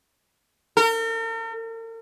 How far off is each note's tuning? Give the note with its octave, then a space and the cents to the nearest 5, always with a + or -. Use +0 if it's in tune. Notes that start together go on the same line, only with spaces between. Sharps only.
A#4 -45